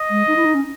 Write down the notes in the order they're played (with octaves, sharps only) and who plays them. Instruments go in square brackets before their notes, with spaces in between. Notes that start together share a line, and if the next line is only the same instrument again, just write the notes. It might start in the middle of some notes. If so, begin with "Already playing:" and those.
Already playing: [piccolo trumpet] D#5
[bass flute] G#3
D#4
E4
D#4
C#4